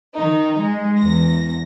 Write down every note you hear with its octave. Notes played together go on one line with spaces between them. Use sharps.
D#3 D#4
G#3
E2 A#6